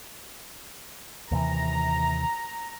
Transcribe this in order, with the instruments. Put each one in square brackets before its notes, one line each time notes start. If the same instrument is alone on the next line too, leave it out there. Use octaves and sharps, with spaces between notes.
[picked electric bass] D#2 C3 E3 [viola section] A#5